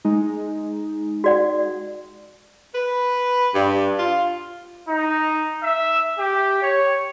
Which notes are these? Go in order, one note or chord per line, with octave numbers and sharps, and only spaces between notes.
G#3 D#4
F#4 D5 F#5
B4
G2
F4
D#4
E5
G4
C#5